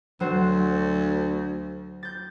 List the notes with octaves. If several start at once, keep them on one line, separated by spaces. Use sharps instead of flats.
D2 F#3 F#4 C5
G6 A6